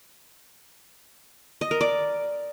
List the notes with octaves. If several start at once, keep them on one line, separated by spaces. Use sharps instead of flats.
D#5
A#4
D5